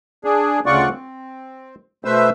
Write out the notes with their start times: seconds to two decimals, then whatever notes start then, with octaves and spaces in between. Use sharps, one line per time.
0.24 D4 G#4
0.66 D2 C#3 F4 D5 F#5 C#6
0.90 C4
2.05 B2 A3 B4 C5 E5 E6